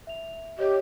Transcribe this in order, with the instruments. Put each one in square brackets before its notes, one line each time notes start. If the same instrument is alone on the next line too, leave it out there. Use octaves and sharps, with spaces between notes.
[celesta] E5 F7
[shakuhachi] G4 [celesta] C#5 D#5